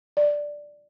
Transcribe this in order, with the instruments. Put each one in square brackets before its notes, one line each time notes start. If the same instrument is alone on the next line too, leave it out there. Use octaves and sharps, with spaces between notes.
[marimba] D5